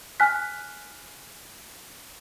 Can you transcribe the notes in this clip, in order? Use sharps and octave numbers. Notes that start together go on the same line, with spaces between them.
G#5 F6 F#6 B6